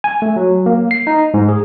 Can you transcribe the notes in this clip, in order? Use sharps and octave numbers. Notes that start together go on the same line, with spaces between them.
G#5
A3
F#3
A#3
C7
D#4
G#2
G#4